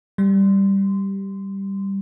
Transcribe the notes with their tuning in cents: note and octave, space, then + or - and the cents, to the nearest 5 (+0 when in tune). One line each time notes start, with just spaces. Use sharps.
G3 +0 C6 -15